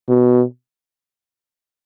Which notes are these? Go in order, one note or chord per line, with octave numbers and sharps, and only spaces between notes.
B2